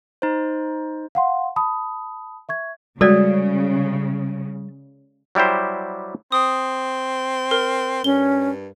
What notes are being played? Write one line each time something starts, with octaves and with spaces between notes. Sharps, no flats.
D#4 C5
F5 F#5 C6
A5 B5 D#6
E5 C#6 G#6
C#3 G3 G#3 F#4 A4 D5
F#3 G3 E4 G4 C5
C4 D#6
A#4
G2 C#4 G7